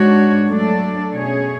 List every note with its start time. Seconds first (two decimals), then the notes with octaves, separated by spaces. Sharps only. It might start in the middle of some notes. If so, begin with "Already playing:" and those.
Already playing: G#2 G#3 D4 F#4 C#5
0.48 F#3 A3 D4 A4 D5
1.14 B2 A3 C#4 G#4 C#5